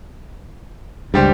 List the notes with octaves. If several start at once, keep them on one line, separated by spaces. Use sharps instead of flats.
C#2 G2 G3 G4 C5